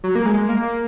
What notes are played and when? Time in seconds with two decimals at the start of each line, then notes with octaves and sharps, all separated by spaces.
0.04 F#3
0.15 A#3
0.26 G#3
0.49 A#3